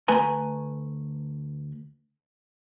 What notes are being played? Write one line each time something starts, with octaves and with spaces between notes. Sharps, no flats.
D2 A3 B4 G#5 A#5